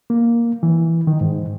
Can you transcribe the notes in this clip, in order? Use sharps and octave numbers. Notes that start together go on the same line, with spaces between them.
A#3
E3
D#3
G#2